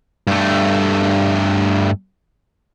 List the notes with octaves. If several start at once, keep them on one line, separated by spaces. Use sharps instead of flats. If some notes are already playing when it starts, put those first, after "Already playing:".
G2 A3